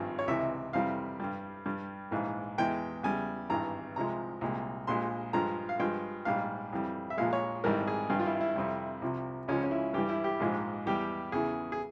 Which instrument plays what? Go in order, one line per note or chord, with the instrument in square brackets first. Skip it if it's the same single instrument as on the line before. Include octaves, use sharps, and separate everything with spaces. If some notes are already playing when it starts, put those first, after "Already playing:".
Already playing: [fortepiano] G#1 G2 F3
C#5
C#2 C3 E3 E5
F2 C3 E3 G3 F5
G2 G3
G2 G3
A#1 G#2 E3
E2 E3 G#3 G5
E2 C#3 G3 G#5
G#1 G2 E3 A#5
C2 C3 F3 G#3 A#5
C2 A#2 G#3
A#1 A#2 F3 G#3 C6
G2 F3 G#3 A#5
F5
G2 F3 G#3 G5
A#1 G#2 G3 F5
F2 E3 G3
E5
A#1 A#2 F3 G#3 F5
C#5
G#1 G#2 E3 G3 A#4
G#4
G#1 G2 G3
F4
E4
E4
F2 C3 G3
C2 C3 F3
C#2 C#3 F3 G#3 C#4
C#4
E4
G2 E3 G3 G4
E4
G4
A#1 G#2 F3 G#3
E2 E3 G3 G4
E2 C#3 E3 G#4
G#4